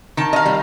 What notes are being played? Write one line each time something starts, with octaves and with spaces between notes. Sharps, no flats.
D#3 A5
D#5
F5
G3